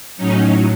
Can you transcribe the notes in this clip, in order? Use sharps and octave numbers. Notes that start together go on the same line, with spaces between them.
A2 F#3 C#4 D#4